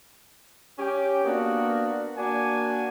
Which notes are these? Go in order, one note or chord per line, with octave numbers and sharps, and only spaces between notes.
C#4 G4
A#3 B3 D4 F#4
A#3 D4 F#4 G#5